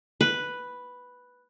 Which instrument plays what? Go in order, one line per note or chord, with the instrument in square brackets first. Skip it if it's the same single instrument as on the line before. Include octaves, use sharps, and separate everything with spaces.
[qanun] B4